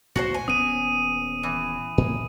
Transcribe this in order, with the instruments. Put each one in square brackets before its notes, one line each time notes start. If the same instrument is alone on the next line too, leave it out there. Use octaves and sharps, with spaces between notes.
[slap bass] C#2 G2 A#2 [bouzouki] F#4 G#4 C5
[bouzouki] G#5
[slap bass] D#1 B3 C#4 [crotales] D#6 D#7
[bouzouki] E3
[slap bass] A2 A#3